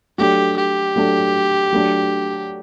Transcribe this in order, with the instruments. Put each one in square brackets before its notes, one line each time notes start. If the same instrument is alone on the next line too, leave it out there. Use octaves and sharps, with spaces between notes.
[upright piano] F#3 A3 D4 A4 [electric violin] G4
[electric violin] G4
[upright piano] F#3 A3 D4 A4
F#3 A3 D4